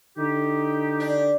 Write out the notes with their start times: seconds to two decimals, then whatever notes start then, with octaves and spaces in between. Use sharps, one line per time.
0.18 D3 D#4 G4
1.00 D4